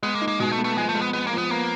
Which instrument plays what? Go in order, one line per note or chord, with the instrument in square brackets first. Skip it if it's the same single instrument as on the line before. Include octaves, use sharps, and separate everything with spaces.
[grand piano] G#3 [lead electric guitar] B3
[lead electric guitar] A#3
[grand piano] D#4
[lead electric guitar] A#3
[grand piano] B2 [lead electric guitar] G#3
[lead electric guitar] A3
[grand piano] B3
[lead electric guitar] A3
[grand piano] F3 [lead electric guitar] G#3
[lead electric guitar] A3
[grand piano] G#3
[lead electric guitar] B3
[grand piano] G#3 [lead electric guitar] B3
[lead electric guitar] A#3
[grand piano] F3
[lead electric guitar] B3
[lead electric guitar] A#3 [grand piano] B3